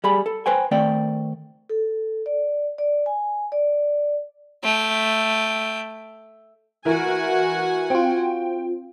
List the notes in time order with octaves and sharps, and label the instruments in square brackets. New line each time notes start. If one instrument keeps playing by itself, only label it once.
[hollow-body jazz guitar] G3 G#4 B5
A4
B4 C5 G5 G#5
D#3 A3 C4 D5 G5
[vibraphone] A4
D5
D5
G#5
D5
[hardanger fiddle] A3 G5
[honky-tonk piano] E3 E4 A#4 [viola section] F#4 F#5 G#5
[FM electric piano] C4 F4 [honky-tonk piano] G5